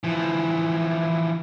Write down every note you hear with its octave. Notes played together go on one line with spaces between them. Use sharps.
E3 F3